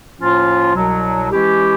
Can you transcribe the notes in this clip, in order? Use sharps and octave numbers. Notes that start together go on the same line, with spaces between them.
A2 F3 A#3 C#4 F4
C2 B2 F#3
E3 G#3 C#4 E4 G4